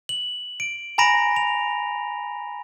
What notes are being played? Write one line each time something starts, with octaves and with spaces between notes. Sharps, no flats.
F#7
D7
G#5 A#5 B5 A#6 D7 E7
F7